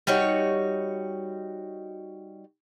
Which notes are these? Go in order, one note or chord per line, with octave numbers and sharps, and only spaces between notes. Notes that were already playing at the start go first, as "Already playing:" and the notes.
G3 D#4 F#4 C#5